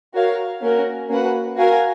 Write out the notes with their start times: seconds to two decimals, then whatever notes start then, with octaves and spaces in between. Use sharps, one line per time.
0.14 F#4 A#4 C#5 F5
0.61 A#3 C#4 F#4 A#4
1.09 A#3 C#4 F#4 B4 F#5
1.58 F#4 A#4 F5 G#5